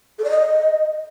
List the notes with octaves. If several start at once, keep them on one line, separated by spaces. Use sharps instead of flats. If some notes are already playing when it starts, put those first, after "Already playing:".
A4
D5
D#5